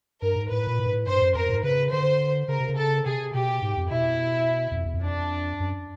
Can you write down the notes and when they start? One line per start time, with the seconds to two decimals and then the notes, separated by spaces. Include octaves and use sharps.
0.22 G2 A#4
0.36 G#2
0.50 A2 B4
0.67 A#2
0.79 A2
0.86 G#2
0.93 A2
1.07 G2 C5
1.22 F#2
1.35 F2 A#4
1.46 F#2
1.49 A2
1.54 G#2
1.63 C#3 B4
1.92 D3 C5
2.48 C#3 A#4
2.60 C3
2.69 C#3
2.77 A4
3.05 C3 G#4
3.34 B2 G4
3.62 G#2
3.77 F2
3.90 B2 E4
4.71 E2
4.76 F2
4.85 E2
4.94 F2
5.03 D4
5.60 F#2